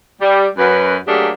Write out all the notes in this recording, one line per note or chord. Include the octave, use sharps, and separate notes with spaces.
G3
F#2 B4
F#3 A3 A#3 D4 G4 G#4